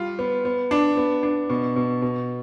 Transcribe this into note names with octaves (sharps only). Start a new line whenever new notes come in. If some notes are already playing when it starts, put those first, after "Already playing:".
Already playing: G3 F4
B3
B3
D4
B3
D4
B2
B2
B2